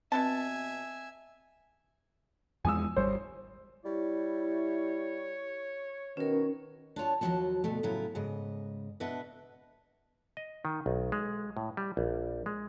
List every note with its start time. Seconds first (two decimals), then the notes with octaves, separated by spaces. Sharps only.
0.12 B2 C4 D4 E5 G#5 A5
2.65 E2 F3 G#3 G#5 D#6 E6
2.97 G#1 G3 C5 C#5
3.85 G3 E4 C#5
6.17 B2 D#3 C#4 A#4
6.96 D4 F4 C#5 A5
7.21 D#2 F3 F#3 C4 F#4 A5
7.64 D2 B2 A3
7.83 A2 C#3 F#3 E4 F4
8.15 G#2 C#3 D#5
9.00 B2 D4 B4 D#5 E5 F#5
10.37 D#5
10.65 D#3
10.86 B1
11.12 G#3
11.57 A2
11.77 G3
11.97 A#1
12.46 G#3